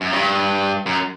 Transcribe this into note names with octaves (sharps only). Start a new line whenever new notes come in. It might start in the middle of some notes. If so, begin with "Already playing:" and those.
F#2
G2
F#2